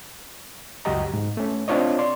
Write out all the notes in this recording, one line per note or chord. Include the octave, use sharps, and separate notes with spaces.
C#2 F#2 F#4 G4 D#5 A#5
G#2
A3 C#4
C4 D4 F4 C#5 D#5
D5 C6